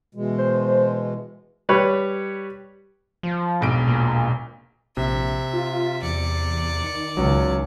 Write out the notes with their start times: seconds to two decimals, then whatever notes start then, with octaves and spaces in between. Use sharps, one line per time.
0.15 B2 E3 G#3
0.38 C5
1.69 G3 B4 C#5
3.23 F3
3.61 E1 B1 D7
3.87 A#2
4.97 A#1 C3 E5
5.53 F4
6.03 E2 D5 C#7
6.83 D#3
7.17 C#2 F#3 C#4